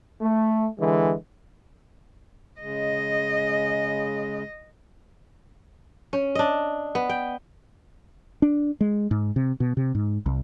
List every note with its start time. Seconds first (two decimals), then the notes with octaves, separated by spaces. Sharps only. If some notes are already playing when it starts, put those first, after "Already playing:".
0.22 A3
0.79 D3 E3 G#3
2.61 C#3 G#3 D#5
6.13 C#4
6.35 D4 D#5
6.95 B3
7.09 G5
8.42 D4
8.81 G#3
9.11 G#2
9.36 C3
9.60 B2
9.77 C3
9.95 G#2
10.26 C2